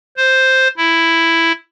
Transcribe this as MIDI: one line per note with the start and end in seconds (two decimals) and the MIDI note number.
0.17 0.68 72
0.78 1.52 64